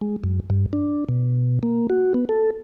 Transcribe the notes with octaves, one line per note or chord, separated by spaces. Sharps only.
G#3
F#2
G2
D4
B2
A#3
F#4
B3
A4